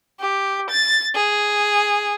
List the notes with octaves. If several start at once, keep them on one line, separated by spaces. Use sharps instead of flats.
G4
A6
G#4